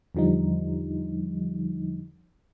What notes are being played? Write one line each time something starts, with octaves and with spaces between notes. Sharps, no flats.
E2 D3 F3 G3 D#4